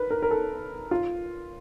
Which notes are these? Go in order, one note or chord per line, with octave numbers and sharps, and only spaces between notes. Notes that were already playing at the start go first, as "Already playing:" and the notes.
Already playing: A#4 B4
A#4
A#4
A4
F4